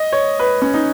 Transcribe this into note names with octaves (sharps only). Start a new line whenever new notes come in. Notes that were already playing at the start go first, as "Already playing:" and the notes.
Already playing: D#5
C#5
B4
C#4
D#4